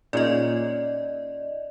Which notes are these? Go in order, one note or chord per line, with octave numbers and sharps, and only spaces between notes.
A#2 C#4 D#4 G#4 D5 D#5